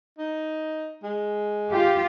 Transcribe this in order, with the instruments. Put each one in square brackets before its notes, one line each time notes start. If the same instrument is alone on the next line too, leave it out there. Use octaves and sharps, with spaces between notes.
[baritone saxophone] D#4
G#3
[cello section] F4 G4